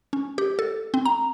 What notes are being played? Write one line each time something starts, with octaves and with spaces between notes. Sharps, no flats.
C#4
G4
A4
C4
A#5